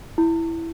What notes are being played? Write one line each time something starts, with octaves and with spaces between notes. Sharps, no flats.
E4